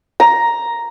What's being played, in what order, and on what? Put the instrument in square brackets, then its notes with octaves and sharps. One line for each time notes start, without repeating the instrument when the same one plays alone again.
[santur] A#5